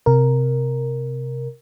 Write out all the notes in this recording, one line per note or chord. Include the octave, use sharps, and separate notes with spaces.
C3 A#4